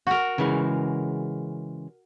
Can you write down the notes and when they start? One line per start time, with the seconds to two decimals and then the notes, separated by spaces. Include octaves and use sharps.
0.07 F#4 A#4
0.38 C#3 E3 G#3